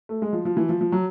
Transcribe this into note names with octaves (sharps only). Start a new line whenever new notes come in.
A3
G#3
F3
F3
E3
F3
F3
F#3